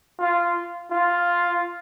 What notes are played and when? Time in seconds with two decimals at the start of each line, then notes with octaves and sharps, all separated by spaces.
0.19 F4
0.91 F4